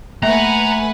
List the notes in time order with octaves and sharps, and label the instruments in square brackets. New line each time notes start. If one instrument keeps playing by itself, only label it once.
[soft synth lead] A3 [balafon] A#3 E5 [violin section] B4 F#5 G#5 [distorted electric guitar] A#5